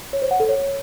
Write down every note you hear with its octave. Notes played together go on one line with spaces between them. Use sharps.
C#5
C5
F#5
A4
C#5